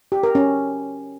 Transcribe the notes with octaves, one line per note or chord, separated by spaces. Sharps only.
G4
A#4
C#4